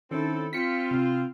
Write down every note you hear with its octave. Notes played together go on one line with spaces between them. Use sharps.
D#3 C4 C#4 E4 A4
C4 F4 B6 C#7
C3